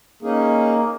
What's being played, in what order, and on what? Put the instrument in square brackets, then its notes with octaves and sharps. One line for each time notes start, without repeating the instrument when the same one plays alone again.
[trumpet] A#3 [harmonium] C#4 D#4 G#4